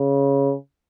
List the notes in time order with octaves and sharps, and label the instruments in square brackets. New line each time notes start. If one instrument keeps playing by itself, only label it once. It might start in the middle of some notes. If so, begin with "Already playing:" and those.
Already playing: [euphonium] C#3